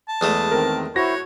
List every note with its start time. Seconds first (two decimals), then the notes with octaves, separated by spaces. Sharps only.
0.09 A5
0.21 E2 G#3 A3
0.52 D#3 C4 A#4
0.96 E4 F#4 C5 C#5 A#6